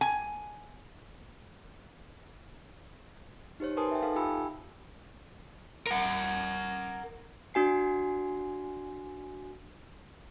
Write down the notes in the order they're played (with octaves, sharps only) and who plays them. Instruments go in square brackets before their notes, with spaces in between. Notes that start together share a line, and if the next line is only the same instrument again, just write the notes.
[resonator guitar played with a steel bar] G#5
[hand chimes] D#4 G4 C5 C#5
A#4 B4 G#5 A5 C6 D#6
E5 G5
D#4 A4 F5 G5 A5
F4 G4 G5 G#5 B5 E6
[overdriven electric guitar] A#4 F#5
[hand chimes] D4 F#4 G#5 C7